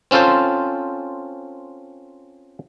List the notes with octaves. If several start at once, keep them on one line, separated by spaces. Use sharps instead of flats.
C4 C#4 F4 A4 C5